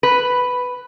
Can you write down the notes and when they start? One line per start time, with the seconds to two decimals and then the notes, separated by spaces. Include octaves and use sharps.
0.03 B4